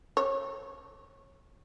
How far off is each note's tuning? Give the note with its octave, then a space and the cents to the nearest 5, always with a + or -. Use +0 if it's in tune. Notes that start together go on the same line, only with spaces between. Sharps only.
C#5 -25